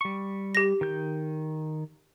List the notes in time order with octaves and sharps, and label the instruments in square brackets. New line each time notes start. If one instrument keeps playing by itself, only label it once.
[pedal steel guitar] G3 C#6
[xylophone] G4 A#6
[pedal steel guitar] D#3 G6